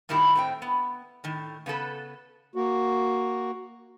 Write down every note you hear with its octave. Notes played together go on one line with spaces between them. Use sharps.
G2 A#2 D#3 E4 G4
A2 C4 G5
B3
A2 D#3
C#3 B3 D#4 A4 B4
A#3 F#4